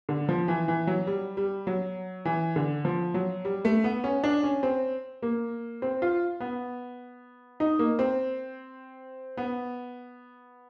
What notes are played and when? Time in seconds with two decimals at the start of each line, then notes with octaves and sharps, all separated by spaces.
0.09 D3
0.29 F3
0.48 E3
0.68 E3
0.87 F#3
1.07 G3
1.37 G3
1.67 F#3
2.25 E3
2.56 D3
2.85 F3
3.14 F#3
3.45 G3
3.65 A3
3.84 B3
4.04 C#4
4.24 D4
4.43 C#4
4.63 C4
5.22 A#3
5.82 C4
6.02 F4
6.40 B3
7.60 D#4
7.79 A#3
7.99 C4
9.37 B3